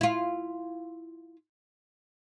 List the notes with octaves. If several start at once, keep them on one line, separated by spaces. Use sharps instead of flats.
E4 F4